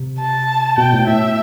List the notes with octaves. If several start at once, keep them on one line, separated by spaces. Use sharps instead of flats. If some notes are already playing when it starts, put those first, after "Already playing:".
Already playing: C3
A5
B2 G5
A2
A2 E5